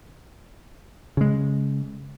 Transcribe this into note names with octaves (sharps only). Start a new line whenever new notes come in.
C#3 G#3